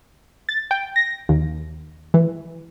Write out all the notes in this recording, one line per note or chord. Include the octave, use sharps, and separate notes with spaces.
A6
G5
A#6
D#2
E3